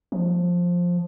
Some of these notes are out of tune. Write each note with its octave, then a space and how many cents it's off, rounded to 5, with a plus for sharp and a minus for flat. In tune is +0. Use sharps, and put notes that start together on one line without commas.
F3 +10